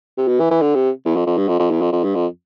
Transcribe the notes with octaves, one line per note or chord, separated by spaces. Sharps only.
C3
B2
E3
E3
D3
C3
E2
F2
F2
G2
F2
F2
E2
F2
F2
G2
F2